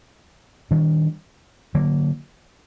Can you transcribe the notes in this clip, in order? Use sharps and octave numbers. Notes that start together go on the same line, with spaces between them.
D#3 G3 D4
D3 F#3 A#3